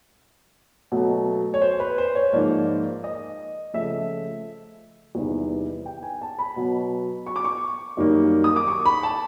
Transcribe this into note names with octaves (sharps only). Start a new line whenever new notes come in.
B2 F#3 A3
C#5
C5
B4
C5
C#5
G#2 F3 A#3 D5
D#5
C#3 F3 A3 E5
E2 C3 D#3 G3 B3
G5
G#5
A5
B5
B2 F#3 B3
C#6
D6
C#6
F#2 D#3 G3 A#3
D#6
D6
C#6
B5
A5